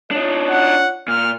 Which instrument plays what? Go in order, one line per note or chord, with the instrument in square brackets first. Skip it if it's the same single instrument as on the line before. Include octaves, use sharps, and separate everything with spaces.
[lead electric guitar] D4 D#4 [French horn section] F4 C#5
[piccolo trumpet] F#5
[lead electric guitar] A#2 [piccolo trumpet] F6